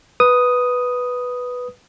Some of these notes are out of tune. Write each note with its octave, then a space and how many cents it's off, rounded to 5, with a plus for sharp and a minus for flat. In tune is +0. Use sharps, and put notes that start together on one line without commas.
B4 +0 D#6 +0